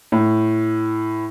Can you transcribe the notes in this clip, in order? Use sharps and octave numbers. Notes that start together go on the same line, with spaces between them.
A2